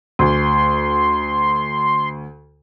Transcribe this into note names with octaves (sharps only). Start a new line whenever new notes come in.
D2 C6